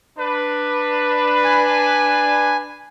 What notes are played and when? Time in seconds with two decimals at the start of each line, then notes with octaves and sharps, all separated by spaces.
0.18 D4 B4
1.44 G#5